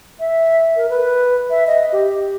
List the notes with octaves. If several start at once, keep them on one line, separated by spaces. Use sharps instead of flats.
E5
A#4
B4
E5
D#5
G4